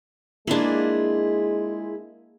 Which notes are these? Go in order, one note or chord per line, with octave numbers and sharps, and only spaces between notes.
G#3 A#3 D4 E4 F4 G#4